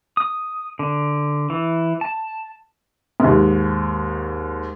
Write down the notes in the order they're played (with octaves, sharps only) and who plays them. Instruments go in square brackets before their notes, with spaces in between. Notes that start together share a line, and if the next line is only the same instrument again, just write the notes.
[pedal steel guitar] D#6
D3
E3
A5
[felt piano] D#2 G#2